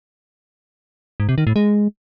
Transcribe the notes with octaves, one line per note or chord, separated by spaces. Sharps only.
G#2
C3
D#3
A2
G#3